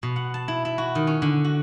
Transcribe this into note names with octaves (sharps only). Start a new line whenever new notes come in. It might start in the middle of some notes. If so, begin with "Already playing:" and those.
B2
F#5
A5
E4
E4
F#4
D#3
C#4
D3
F#4